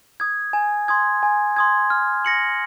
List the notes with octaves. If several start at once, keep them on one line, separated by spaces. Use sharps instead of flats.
D#6 G#6
G#5
C6 D#6 G#6
G#5
C6 D#6 G#6
F6
A#6 C#7 F#7